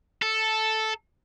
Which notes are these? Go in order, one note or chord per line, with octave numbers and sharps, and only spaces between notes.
A4